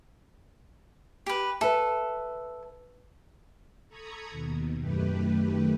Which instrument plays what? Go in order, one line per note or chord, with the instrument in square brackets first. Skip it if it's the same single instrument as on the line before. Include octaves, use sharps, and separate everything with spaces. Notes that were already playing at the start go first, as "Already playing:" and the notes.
[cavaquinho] G4 B4
[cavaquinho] A4 [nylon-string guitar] B4 E5
[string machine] A4 A#5 B5 C#6 D#6 G#6
D#2 B2
F#2 D#3 A3 G4 B4